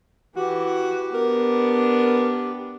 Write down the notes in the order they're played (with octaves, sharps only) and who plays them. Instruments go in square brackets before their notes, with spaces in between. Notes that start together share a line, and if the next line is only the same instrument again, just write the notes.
[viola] E3 [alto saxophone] F#4 [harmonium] G4
[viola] B3 D4 [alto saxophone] A#4